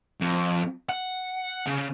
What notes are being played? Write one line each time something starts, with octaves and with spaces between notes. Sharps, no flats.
F2
F#5
C#3